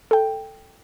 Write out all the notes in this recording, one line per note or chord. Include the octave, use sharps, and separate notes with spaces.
A4 G5